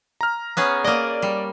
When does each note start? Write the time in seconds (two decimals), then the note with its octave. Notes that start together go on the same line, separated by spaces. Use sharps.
0.21 A#5 F6
0.57 B3 C#4 G#4
0.84 A#3 D5 D#5
1.22 G3